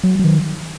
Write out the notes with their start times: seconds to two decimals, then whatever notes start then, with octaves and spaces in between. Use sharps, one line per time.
0.04 F#3
0.19 F#3
0.24 D#3